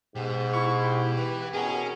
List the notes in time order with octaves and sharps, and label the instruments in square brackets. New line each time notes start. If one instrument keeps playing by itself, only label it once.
[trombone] G#2 [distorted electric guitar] B2 [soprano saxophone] G4
[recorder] E4 [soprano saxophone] C#6
[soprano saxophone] G4
[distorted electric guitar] E3 [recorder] B4
[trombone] B2 [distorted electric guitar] C#4 [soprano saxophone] G#4 [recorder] A#4